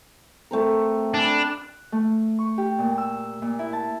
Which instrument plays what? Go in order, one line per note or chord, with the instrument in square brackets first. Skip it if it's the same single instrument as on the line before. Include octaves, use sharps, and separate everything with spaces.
[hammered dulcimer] A3 C4 A#4
[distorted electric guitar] D4 [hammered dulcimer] G#5 B5
[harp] F#6
A3
C#6
G4
A#2
E6
A#2
E4
A5